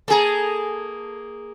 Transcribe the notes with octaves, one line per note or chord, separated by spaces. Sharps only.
A#3 G#4 A4 G#5 A#5